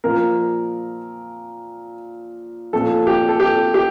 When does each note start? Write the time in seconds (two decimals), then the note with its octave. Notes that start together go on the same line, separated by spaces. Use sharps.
0.04 A#2 F3 A#4
2.73 A#2 F3 A4
3.07 G4
3.28 A4
3.40 G4
3.74 G4